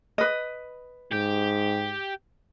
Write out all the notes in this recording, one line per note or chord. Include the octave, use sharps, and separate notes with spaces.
B4 D#5
G#2 G4